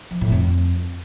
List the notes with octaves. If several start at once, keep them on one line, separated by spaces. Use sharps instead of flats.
F3
A2
F2